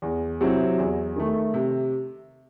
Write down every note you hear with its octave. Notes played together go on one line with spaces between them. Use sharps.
E2
C3 F#3 C4 E4
E2
D#3 A3
C3